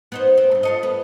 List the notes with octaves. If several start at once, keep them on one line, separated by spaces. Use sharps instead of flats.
B3 D#4 C5
C4
G2 A#2
F4 A4 D#5
B3